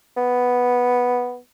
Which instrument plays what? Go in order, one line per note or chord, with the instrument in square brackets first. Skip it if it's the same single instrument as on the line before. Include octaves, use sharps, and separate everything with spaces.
[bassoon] B3